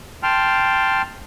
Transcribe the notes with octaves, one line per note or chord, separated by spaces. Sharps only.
G5 A5 C6 F6